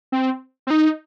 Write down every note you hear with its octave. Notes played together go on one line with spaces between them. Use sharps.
C4
C4
D#4